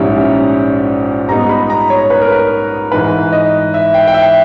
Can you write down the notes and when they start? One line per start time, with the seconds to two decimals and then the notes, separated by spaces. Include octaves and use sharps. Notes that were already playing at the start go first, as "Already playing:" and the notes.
Already playing: A#1 G#2 G3 C#4 E4
1.29 G#2 G3 B3 D#4 A#5
1.49 B5
1.70 A#5
1.90 C#5
2.10 B4
2.21 A#4
2.32 B4
2.92 G#2 E3 G#3 D#4 B4
3.33 D#5
3.74 E5
3.94 G5
4.08 G5
4.14 E5